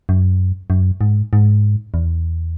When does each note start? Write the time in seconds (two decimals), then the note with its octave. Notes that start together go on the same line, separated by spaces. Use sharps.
0.09 F#2
0.70 F#2
1.01 G#2
1.33 G#2
1.94 E2